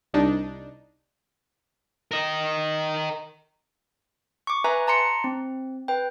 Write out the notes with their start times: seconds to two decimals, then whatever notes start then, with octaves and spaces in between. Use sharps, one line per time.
0.14 C2 D4 D#4
2.12 A#4 D#5
4.47 C#6 D6
4.64 B4 E5 G#5 A#5 F#6
4.87 A5 A#5 C6 C#7
5.24 C4
5.88 B4 G5